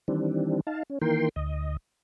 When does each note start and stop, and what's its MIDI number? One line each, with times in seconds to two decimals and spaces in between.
0.08 0.61 51
0.08 0.61 52
0.08 0.61 55
0.08 0.61 60
0.08 0.61 62
0.67 0.83 63
0.67 0.83 77
0.67 0.83 81
0.90 0.99 61
1.02 1.29 51
1.02 1.29 52
1.02 1.29 58
1.02 1.29 70
1.02 1.29 79
1.02 1.29 84
1.36 1.77 38
1.36 1.77 75